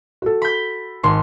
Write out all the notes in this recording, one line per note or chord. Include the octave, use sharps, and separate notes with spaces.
F#4 A4
B5 G6
G#1 C6